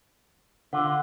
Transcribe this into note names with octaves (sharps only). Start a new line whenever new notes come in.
D3 F4 F#5